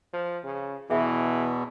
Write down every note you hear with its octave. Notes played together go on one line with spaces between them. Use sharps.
F3
C#3
E2 B2 E3 B3 G#4 E5 B5